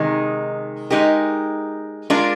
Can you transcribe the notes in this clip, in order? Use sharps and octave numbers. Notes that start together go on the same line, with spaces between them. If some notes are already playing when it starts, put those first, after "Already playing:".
Already playing: C3 D#3 G#3 D#4
G#3 D#4 G4 A#4
G#3 D4 F4 A#4